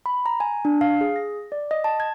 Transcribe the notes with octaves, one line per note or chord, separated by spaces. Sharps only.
B5
A#5
G#5
D4
F5
G#4
A#6
D5
D#5
A5
G#6